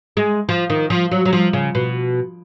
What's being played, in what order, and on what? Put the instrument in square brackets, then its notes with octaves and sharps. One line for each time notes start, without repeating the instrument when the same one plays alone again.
[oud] G#3
F3
D#3
F3
F#3
F#3
F3
C#3
B2